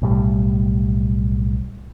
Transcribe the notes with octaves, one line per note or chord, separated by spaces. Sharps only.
B1 A2 G3